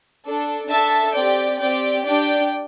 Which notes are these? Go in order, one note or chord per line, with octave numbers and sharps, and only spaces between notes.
D4 A4
D4 A4 E5 A5
C4 G4 D5 G5
C4 G4 D5 G5
D4 G4 D5 G5